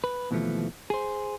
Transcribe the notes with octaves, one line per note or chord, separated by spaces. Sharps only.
B4
D#2 B2 E3 F3 A3
G#4 C5